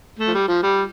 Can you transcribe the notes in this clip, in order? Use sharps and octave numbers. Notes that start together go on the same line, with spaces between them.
A3
F3
G3
F3
G3